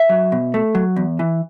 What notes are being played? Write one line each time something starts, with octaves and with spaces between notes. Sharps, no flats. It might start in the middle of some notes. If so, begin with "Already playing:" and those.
Already playing: E5
F#3
B2
A3
F#3
E2
E3